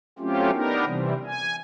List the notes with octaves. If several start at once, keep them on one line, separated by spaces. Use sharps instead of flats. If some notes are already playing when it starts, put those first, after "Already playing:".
F#3 A3 C4 C#4 F4 G4
B3 D4 D#4 G4 A#4
C3 E3 G3 C4
G#5